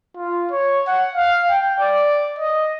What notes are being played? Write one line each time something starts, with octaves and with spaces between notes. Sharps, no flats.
F4
C#5
F#5
F5
G5
D5
D#5